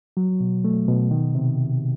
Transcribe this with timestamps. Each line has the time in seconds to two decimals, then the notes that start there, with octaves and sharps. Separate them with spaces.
0.17 F#3
0.40 B2
0.64 A3
0.88 B2
1.11 D#3
1.35 C3